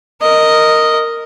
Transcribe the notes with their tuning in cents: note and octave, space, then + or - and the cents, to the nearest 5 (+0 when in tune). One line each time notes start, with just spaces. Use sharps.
A#4 -10 D#5 +0